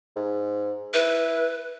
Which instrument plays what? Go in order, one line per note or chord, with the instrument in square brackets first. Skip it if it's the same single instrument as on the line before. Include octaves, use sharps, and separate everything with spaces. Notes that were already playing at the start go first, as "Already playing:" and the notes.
[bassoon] G#2
[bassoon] E4 [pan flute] B4